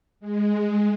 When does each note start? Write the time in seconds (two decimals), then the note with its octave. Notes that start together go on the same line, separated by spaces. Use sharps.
0.20 G#3